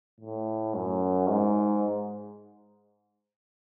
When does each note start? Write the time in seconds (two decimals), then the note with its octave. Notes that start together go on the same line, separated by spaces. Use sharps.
0.21 A2
0.75 F#2
1.28 G#2